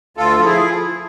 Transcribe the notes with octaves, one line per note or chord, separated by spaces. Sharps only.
D2 F4 A4
F3 A4
E4 G#4